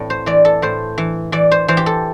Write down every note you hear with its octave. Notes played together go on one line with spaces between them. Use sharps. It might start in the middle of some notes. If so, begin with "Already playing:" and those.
Already playing: A2 E3 C4
C5
E3 D5
A4
A2 C5
E3
E3 D5
C5
E3 C5
G4
A4